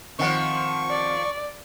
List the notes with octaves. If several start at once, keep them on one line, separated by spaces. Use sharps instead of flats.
D#3 F3 C4 F#5 C#6
D5